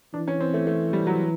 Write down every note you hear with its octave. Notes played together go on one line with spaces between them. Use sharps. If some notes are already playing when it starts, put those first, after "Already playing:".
E3 D4
C#4
C4
A3
A3
G3
F#3